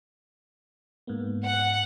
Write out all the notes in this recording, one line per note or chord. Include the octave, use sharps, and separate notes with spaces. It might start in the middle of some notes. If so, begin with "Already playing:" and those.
G#2 A#3 B3
F#5